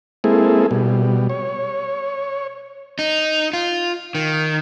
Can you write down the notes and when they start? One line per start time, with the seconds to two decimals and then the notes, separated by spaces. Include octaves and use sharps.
0.24 G#3 A#3 C4 E4 G#4 A4
0.71 B2 G3
1.30 C#5
2.99 D#4
3.53 F4
4.15 D#3